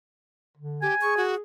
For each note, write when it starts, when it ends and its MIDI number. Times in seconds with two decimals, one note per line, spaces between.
0.57 0.86 50
0.82 0.95 67
0.82 1.23 80
1.01 1.41 68
1.01 1.17 85
1.17 1.35 66